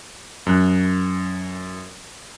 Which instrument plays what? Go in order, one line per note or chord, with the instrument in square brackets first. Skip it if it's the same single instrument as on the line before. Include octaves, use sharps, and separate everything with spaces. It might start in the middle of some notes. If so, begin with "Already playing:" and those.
[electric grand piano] F#2 F#6